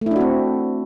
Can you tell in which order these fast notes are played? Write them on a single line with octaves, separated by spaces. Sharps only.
A3 E4 D4 F#4 C4